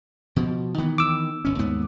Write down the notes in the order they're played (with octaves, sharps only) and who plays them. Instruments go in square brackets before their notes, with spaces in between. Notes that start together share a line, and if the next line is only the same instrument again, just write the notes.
[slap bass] B2 F3
D#3 E3 B3
[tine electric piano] D6 E6
[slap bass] G1 C#4
D#2 G#2 B3